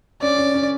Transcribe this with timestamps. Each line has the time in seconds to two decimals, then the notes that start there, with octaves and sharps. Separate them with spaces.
0.22 C#4 D5
0.38 C#4
0.54 C#4